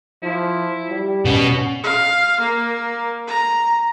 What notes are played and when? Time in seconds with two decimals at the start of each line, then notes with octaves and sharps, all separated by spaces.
0.23 F3 E4
0.89 G3
1.26 B2 B3 C#4 F#5
1.83 F5
2.40 A#3
3.28 A#5